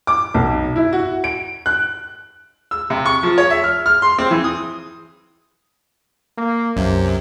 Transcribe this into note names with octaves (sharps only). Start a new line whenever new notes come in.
D6
B1
E4
F#4
D7
F#6
E6
C3
C#6
F3
C#5
E5
F6
F6
C6
C4
E3
D#6
A#3
C2 F#2 C3 F4